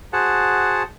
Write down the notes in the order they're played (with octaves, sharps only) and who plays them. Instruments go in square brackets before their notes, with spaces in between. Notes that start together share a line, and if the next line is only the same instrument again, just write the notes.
[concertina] F#4 G#4 C5 F#5 A5